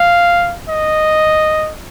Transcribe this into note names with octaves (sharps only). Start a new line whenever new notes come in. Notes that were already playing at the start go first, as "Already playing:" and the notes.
Already playing: F5
D#5